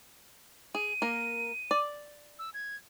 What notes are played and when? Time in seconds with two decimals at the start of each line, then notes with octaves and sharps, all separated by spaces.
0.75 G#4 D#7
1.02 A#3 A#4
1.71 D5
2.39 E6
2.54 G#6